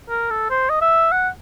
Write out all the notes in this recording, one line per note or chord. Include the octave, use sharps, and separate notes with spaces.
A#4
A4
C5
D#5
E5
F#5